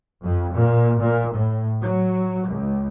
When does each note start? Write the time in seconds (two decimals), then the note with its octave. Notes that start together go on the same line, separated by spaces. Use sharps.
0.24 F2
0.57 A#2
1.01 A#2
1.33 A2
1.82 F#3
2.48 C#2